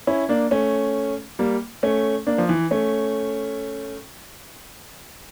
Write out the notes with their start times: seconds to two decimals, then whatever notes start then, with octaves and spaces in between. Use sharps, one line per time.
0.07 C#4 E4
0.29 A#3 D4
0.51 A3 C#4
1.39 G3 A#3
1.83 A3 C#4
2.27 A#3 D4
2.38 F3
2.49 E3
2.71 A3 C#4